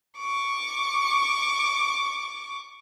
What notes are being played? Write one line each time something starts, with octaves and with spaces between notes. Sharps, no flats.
C#6 D6